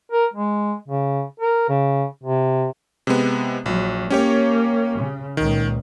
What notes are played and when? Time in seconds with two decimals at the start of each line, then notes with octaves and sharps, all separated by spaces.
0.12 A#4
0.34 G#3
0.88 C#3
1.40 A#4
1.69 C#3
2.24 C3
3.07 C3 G#3 B3
3.66 A#1 F#3
4.10 A#3 C#4 G4 C#5
4.98 C#3
5.37 C#2 A#2 D#3